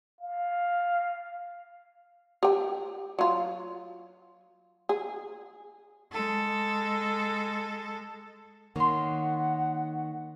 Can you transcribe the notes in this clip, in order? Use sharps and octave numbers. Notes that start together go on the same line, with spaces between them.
F5
G4 G5
F#3 F4
G#4
G#3 A4
D#3 A#3 C#5 F#5 C6